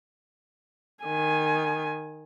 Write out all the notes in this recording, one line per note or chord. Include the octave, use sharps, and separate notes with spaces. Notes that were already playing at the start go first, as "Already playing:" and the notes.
D#3 G#5